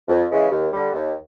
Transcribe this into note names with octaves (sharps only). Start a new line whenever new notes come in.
F2
C#3 E3 G#3
D#2
D3 G3
D#2